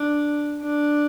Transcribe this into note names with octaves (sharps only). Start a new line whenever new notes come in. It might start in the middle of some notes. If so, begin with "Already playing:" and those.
Already playing: D4
D4